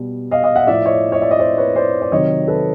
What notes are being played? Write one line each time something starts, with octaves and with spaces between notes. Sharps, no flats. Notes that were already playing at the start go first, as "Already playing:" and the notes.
Already playing: B2 G3
D#5 F5
D#5 F5
E5 F#5
A2 F3 D5 E5
C#5 D#5
C#5 D#5
D5 E5
C#5 D#5
C5 D5
B4 C#5
C5 D5
D5
C3 D#3 F#3 C#5 D#5
A4 B4